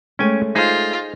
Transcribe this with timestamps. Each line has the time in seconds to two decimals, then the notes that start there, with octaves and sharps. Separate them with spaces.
0.19 G#3 A3 C#4 C#5 G5 G#5
0.55 D#4 F4 G#4 C5